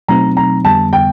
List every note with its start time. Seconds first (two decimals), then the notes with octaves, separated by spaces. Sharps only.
0.08 B2 F#3 A3 C4 D#4 A#5
0.37 A#5
0.64 F2 D3 G3 B3 A5
0.93 G5